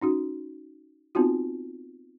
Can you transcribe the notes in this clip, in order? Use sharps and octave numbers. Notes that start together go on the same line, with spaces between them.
C#4 D#4 F#4
B3 C4 D#4 F4 F#4